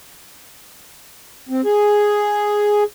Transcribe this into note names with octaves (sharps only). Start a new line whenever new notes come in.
C4
G#4